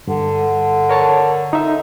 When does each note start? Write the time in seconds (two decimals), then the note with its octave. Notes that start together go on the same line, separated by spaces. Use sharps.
0.07 G2 D3
0.89 A#4 C#5 A5
1.53 D#4 E5